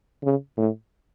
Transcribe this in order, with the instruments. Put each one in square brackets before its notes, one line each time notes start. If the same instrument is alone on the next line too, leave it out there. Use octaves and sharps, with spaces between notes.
[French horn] C#3
A2